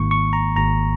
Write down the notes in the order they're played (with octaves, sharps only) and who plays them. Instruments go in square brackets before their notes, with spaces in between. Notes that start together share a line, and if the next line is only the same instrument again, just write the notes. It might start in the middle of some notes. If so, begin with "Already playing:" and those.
Already playing: [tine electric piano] G#1 G#2 D#3 A#3 C#6
C#6
A#5
G#1 G#2 D#3 A#3 A#5